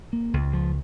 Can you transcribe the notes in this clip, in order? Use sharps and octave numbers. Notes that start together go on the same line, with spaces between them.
A#3
C#2
F3